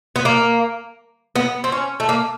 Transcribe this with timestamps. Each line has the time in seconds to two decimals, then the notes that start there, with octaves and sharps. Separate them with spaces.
0.16 B3
0.25 A#3
1.36 B3
1.64 C4
1.72 C#4
2.00 A3
2.09 A#3